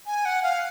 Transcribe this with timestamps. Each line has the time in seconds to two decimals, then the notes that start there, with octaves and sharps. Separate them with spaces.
0.06 G#5
0.25 F#5
0.43 F5